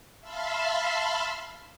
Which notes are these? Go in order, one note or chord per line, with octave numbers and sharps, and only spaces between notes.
E5 F5 A5 B5 C6 F6